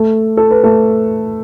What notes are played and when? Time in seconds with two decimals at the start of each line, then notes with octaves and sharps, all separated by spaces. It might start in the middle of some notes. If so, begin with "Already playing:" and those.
Already playing: A3 A4
0.37 A4
0.51 B4
0.64 A3 A4